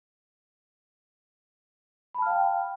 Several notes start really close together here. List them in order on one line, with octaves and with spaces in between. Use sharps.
B5 A5 F6 F5 G5